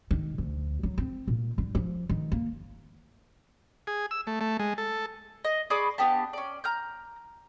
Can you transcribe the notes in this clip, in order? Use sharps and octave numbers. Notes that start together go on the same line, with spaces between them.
D#3
D2
F#3
C4
A#2
G2
F3
D#3
A#3
G#4
E6
A3
A3
G#3
A4
D#5
G#4 D5 B5 C#6
B3 D4 G4 A5
C#4 D5
A#5 F6 G6